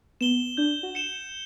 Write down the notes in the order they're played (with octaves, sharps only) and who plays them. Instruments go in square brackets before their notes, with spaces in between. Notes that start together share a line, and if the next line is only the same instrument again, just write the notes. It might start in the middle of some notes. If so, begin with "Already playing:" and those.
[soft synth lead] B3 [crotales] E7 G7
[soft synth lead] D4 [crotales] G6
[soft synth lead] F#4
[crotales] C#7 E7 G7